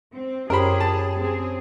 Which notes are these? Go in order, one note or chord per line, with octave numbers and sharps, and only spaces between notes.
C4
F#2 C#4 G4 G#4 A#4 C5 B5
A5
C4 G#4